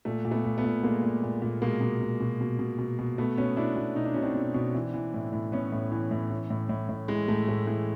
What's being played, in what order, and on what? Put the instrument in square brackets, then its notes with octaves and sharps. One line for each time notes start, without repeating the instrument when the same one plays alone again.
[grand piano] A#2 A3
A#2
A3 B3
A#2
A3 B3
A#2
A#2 G#3 A#3
A#2
A#2
A#2
B2 G#3 A#3
B2
B2
B2
B2
B2
B2
B2
B2 A3 B3
B2 B3 C#4
B2 D4 E4
B2
B2 D#4
D4
B2 C#4
C4 D4
B2
B2
E3
E3
A2
A2
A2 B3 C#4
A2
E3
A2
E3
A2
A2
A2
E3 G#3
A2 A3
A2 A3
E3 G#3